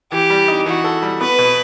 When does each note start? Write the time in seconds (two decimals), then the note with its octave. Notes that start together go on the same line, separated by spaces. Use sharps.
0.11 E3 G4
0.30 G3
0.48 D#4
0.66 E3 F#4
0.84 A4
1.03 G3
1.21 B3 B4
1.39 B2